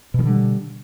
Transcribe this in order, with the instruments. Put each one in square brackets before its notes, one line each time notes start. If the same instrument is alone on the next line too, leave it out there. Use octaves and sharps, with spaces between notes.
[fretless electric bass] B2
D#3
D3
G3